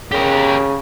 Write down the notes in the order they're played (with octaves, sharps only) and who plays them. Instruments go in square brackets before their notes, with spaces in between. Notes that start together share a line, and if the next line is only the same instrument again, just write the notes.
[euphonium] C#3 [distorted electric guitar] G4 A#4